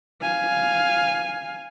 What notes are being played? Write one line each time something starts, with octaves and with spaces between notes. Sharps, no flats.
F5 G#5